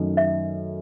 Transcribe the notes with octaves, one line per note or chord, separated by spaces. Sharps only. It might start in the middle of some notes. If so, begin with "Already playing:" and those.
Already playing: F#2 D#3 A3 D#4
E5